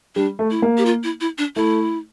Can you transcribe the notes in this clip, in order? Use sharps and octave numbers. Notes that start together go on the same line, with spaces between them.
G3 D4
A3
E4
A#3
G4
F4
E4
E4
D4
A3 E4